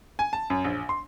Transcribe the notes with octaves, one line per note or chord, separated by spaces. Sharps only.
G#5
A5
F#2
A#1
C6